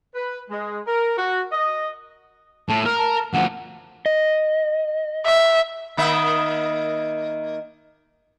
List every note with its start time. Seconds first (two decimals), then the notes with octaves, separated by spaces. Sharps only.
0.15 B4
0.50 G#3
0.87 A#4
1.18 F#4
1.52 D#5
2.69 A2 A5
2.86 A#4 F6
2.98 A5
3.34 D2 F3 F#5
4.06 D#5
5.25 E5
5.97 D#3 A#3 E5